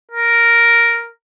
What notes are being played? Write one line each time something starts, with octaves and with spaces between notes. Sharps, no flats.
A#4